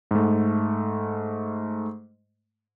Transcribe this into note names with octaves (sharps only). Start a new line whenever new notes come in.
G#2 A3